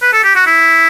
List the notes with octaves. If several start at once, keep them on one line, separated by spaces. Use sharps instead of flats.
B4
A4
G4
F#4
E4